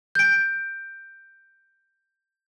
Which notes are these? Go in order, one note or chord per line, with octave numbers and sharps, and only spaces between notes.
G6 D7